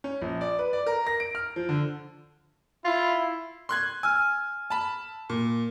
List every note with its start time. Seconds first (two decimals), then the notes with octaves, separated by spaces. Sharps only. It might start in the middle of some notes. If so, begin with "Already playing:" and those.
0.04 C#4
0.22 A#1
0.41 D5
0.59 B4
0.73 D5
0.86 A#4
1.07 A#6
1.20 D7
1.35 F6
1.56 F3
1.69 D3
2.85 E4 F4
3.69 C6 F#6 G#6
4.03 G#5 E6 F6
4.70 A5 B5
5.29 A#2